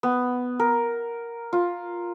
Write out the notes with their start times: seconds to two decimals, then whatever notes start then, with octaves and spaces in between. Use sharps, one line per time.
0.03 B3
0.60 A#4
1.53 F4